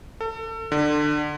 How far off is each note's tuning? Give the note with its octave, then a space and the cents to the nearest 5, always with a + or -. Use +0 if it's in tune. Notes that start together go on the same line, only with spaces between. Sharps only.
A4 +30
D3 +25